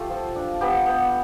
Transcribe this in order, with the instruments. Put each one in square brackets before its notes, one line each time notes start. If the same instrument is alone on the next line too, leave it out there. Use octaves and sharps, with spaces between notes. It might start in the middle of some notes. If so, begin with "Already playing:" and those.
Already playing: [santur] A3 F4 G4 A4
F3
D4
B3 G4
B3